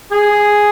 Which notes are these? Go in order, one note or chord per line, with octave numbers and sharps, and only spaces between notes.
G#4